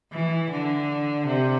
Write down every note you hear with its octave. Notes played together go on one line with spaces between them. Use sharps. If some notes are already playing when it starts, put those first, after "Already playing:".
E3
D3
C3